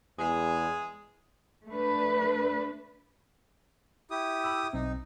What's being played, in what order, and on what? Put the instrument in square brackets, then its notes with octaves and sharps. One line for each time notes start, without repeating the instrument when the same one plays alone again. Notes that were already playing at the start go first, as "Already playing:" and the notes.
[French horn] E2 [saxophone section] G#3 G#4
[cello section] A3 D4 B4
[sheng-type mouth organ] E4 G4 D#6
[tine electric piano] B5 E6
[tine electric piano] B1 C4 [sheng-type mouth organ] D#4